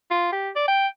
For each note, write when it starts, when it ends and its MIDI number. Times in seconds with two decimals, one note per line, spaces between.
0.11 0.30 65
0.32 0.49 67
0.56 0.63 74
0.68 0.87 79